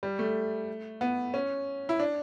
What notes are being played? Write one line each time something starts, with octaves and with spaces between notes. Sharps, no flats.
G3
A3
B3
C#4
E4
D4